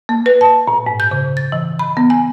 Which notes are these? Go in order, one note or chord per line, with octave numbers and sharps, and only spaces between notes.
A#3
B4
A5
A#2
G#2
G6
C#3
A6
E3
B5
B3
G#5